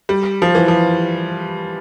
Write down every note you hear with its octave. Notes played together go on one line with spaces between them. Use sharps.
G3
F3
E3
F3